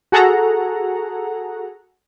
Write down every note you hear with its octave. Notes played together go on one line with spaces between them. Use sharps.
F#4 G#4 A4 F#5 A#5